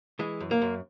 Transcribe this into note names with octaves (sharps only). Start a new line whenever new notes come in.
E3 G#3
F#2
A#3
F#2